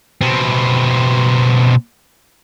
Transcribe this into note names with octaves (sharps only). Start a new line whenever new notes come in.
B2 C4